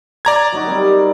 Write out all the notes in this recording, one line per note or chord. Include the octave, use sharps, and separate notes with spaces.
D5 A#5 G#6
F#3 D#4 F#4
G3 C4 A#4